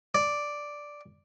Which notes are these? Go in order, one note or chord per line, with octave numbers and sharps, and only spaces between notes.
D5